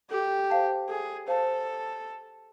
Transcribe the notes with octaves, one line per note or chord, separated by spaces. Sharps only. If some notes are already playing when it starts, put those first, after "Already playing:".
G4 A4
C5 F5 A5
G#4 A4
A4 C5 F5 A5